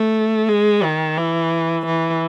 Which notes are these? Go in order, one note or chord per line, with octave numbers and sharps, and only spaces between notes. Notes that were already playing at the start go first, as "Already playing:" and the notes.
Already playing: A3
G#3
D#3
E3
E3